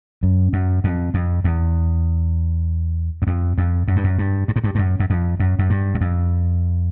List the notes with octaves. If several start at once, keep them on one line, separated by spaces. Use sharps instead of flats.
F#2
F#2
F2
F2
E2
F#2
F2
F2
F#2
G2
F#2
G2
G2
G#2
G2
G2
F#2
F#2
F2
F#2
F#2
G2
F#2
F2